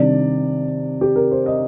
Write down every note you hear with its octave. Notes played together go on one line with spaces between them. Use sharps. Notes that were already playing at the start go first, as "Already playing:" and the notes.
Already playing: C3 D#3 G3 D4 D5
G4
A#4
C5
D#5